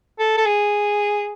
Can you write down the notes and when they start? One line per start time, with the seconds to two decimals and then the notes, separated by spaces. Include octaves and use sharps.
0.19 A4
0.37 A4
0.46 G#4